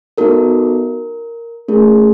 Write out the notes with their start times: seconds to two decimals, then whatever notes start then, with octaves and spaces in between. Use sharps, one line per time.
0.18 B3 D#4 F#4 A4 A#4
1.68 A3 C#4 E4 G#4 A#4